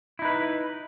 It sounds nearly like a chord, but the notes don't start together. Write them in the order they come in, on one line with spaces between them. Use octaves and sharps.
E4 D#4 B4